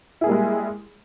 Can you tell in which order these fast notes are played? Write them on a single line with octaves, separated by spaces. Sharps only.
E4 G#4 A#3 G3 G#3